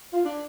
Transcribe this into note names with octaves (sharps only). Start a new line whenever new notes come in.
F4
D4